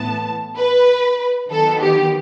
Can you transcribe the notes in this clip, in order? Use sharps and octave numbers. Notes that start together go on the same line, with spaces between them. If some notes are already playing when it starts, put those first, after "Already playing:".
Already playing: A2 E3 B3 A5
B4
D#3 F#3 B3 A4
G4